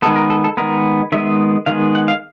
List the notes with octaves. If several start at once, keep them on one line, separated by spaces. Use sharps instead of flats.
D#3 G#3 B3 A4
A#4
A4
A4
D#3 G#3 B3 A#4
D#3 G#3 B3 E5
D#3 G#3 B3 F5
F#5
F5